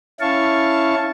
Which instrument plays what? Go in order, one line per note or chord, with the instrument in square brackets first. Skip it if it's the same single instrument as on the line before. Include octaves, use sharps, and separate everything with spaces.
[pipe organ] C#4 E4 F5 A5 C#6